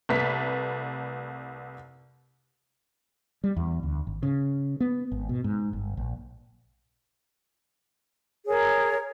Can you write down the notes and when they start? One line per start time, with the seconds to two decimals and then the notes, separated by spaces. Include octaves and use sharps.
0.09 C2 A3 B4 B6
3.44 G3
3.57 E2
3.83 D2
4.07 G#1
4.23 C#3
4.80 B3
5.12 G#1
5.29 B2
5.44 G#2
5.73 G1
5.97 A#1
8.48 G#4 A#4 C#5